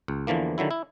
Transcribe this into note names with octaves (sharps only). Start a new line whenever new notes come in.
C#2
E2 D3 E3 F3 A#3
D3 D#3 F#3 E4
E4